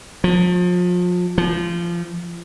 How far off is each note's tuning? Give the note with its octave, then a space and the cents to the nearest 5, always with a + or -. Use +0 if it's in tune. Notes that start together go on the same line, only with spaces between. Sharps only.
F3 +35
F3 -25